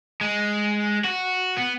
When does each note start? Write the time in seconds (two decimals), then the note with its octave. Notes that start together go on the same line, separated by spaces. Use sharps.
0.21 G#3
1.04 F#4
1.57 B3